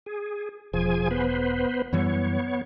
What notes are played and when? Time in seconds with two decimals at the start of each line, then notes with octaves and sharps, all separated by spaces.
0.06 G#4
0.73 E1 F3 G#4 G#5
1.11 B3 B4 C5
1.93 F#2 E3 G3 B3 C#5